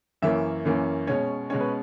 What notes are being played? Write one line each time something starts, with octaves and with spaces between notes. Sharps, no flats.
F#2 E3 A#3 C#4 E5
F#2 E3 A#3 C#4
B2 G#3 C#4 C#5
B2 G#3 C#4 C#5
B4